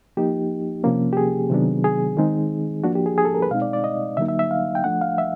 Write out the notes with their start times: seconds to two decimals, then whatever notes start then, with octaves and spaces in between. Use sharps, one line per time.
0.17 F3 A#3 D#4 G4
0.84 C3 F3 A#3 C#4
1.13 G4
1.17 G#4
1.50 C3 D#3 F#3 B3 D4
1.84 G#4
2.17 D#3 G#3 C4 D#4
2.84 F3 A#3 D4 F#4
2.95 G4
3.06 G#4
3.18 G#4
3.25 A4
3.35 A#4
3.42 B4
3.51 B2 G#3 C4 D#4 F5
3.62 D5
3.73 D5
3.84 D#5
4.17 D3 F#3 A#3 D#4 E5
4.28 E5
4.39 E5
4.51 F5
4.75 G5
4.84 F3 A3 D4 F#5
5.01 F5
5.18 E5